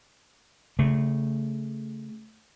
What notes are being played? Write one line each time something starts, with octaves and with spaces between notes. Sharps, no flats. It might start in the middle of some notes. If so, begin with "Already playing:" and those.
C#3 A3